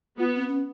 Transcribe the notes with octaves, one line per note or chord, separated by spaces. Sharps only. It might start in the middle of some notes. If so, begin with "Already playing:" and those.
B3 F4
C4
C#4